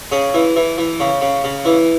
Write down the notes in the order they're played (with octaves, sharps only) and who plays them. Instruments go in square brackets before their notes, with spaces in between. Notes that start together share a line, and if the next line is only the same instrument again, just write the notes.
[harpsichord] C#3 G#4
E3
E3
E3
C#3
C#3
C#3
E3